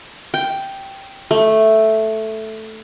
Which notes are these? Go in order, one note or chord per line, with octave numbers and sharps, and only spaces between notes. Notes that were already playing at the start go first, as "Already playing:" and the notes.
G5
A3